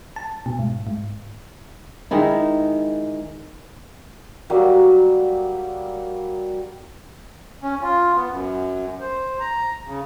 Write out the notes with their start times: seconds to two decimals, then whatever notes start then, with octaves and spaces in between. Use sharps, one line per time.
0.16 A5
0.46 B2
0.59 G#2
0.87 G#2
2.11 D#3 G#3 D#4 E4
4.50 F#3 G3 A#3
7.63 C#4
7.82 F4
8.16 B3
8.30 F#2
9.00 C5
9.40 A#5
9.85 C#3